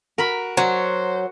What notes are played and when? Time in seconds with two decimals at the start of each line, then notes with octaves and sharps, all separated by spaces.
0.18 F#4 A#4 B5
0.57 F#3 F#4 C5